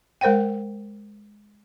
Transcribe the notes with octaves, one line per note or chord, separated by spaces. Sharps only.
G#3 A#4 C5 F#5 G5